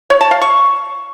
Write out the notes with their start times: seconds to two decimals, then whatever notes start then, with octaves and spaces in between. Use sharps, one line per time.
0.10 C#5
0.21 A5
0.31 F5
0.42 C#6